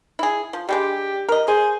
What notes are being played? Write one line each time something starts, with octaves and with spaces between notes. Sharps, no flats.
E4 G#4
F3
G3 G#3 D4 G4
A#4 D#5
G#4 C5